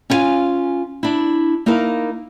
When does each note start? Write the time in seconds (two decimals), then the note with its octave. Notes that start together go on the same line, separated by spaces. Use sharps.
0.10 C#4 E4 F4 F5 G#5
1.03 D4 E4
1.66 A#3 D#4 E4 A#4 F5